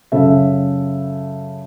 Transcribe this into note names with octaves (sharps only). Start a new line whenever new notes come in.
F#2 C#3 C#4 A4 E5